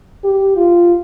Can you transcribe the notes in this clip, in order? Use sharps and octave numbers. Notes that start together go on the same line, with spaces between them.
G4
F4